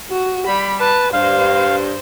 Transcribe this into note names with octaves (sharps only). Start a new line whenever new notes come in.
F#4
G3 B5
B4 A5
G2 C5 F5